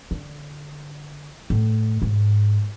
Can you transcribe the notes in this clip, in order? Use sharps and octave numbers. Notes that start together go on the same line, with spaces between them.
D3
A2
G#2